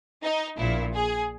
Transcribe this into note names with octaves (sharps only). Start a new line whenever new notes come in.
D#4
A#1 A#2 E4
G#4